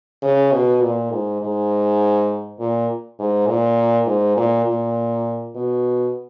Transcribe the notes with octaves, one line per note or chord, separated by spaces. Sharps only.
C#3
B2
A#2
G#2
G#2
A#2
G#2
A#2
G#2
A#2
A#2
B2